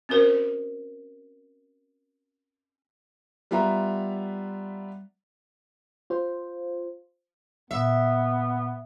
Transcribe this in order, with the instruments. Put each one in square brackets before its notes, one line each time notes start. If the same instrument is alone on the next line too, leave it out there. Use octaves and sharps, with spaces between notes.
[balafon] C4 C#4 F#4 A#4 C5
[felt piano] G3 B3 F4 E5 A#5
[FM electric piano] F4 C5
[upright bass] A#2 [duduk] B3 [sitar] E5